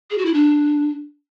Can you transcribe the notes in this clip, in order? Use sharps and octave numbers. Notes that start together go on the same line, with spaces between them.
G#4
F#4
E4
D4